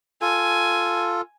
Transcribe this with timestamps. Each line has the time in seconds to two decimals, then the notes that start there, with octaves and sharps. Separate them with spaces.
0.22 F4 A4 G#5